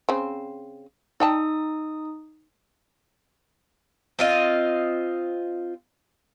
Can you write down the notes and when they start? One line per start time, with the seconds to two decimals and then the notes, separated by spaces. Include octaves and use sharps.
0.09 C#3 C4
1.20 D#4 D5 G5 A5 D#6
4.19 C4 F4 D#5